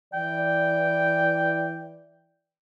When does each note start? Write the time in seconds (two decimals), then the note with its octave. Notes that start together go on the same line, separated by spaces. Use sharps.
0.14 E3 D5 G5